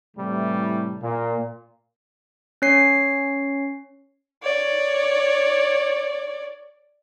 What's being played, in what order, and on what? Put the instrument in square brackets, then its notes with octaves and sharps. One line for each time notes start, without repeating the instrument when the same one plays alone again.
[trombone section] A2 C3 E3 G3 A3
A#2
[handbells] C#4 C#5 C7
[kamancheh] C#5 D5